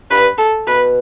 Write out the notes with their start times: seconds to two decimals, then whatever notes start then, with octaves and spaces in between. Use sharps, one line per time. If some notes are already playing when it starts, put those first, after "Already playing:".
0.10 G2 B4
0.38 A4
0.67 B2 B4